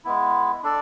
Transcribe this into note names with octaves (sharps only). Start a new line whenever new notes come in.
G#3 B3 E4
D4 A4 D5